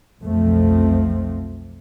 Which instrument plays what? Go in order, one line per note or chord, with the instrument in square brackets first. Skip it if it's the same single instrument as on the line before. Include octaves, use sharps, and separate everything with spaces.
[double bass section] B1 F2 F3 A3 C4